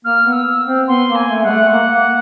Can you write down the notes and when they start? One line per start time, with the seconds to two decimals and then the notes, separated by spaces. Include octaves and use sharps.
0.04 A#3 F6
0.26 B3
0.32 E6
0.67 C4
0.88 B3 C6
1.09 A#3
1.15 G#5
1.29 A3
1.43 G#3 F#5
1.49 A3
1.70 A#3 F#5
1.92 A#3